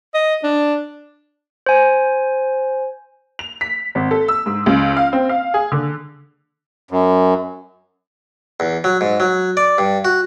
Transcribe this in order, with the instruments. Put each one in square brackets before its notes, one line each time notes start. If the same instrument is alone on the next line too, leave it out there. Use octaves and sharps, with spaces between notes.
[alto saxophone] D#5
D4
[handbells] C5 G#5
[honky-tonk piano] F7
B6
G#1
A4
E6
G#2
C#2
F5
C4
F5
G#4
D3
[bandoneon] F#2
[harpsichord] E2
F#3
G#2
F#3
D5
G2
F#4